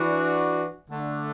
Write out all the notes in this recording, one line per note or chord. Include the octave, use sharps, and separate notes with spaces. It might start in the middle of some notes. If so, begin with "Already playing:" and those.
Already playing: E3 D4 F#4
D3 A3 D4